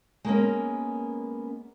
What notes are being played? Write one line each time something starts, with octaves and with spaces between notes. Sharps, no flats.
G#3 A#3 B3 C#4